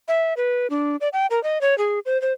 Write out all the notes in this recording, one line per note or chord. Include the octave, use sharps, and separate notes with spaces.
E5
B4
D4
D5
G5
A#4
D#5
C#5
G#4
C5
C5